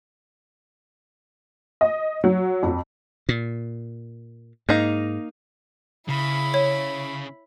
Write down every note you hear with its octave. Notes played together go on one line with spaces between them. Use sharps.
D#5
F#3
F2
A#2
G#2 A#3 D#4
C#3 E4 B5
C#5